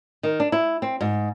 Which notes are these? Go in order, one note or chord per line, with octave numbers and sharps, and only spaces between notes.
D#3
D4
E4
C4
G#2